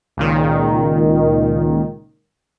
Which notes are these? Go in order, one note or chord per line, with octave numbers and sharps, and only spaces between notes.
C#2 A#2 D#3